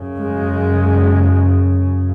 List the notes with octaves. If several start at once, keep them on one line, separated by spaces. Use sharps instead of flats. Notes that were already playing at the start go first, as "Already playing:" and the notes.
Already playing: F#2 C#3
G#3